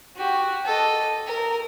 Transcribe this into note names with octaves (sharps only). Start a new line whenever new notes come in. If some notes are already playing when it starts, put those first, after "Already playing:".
F#4 G4
A4 D#5
A#4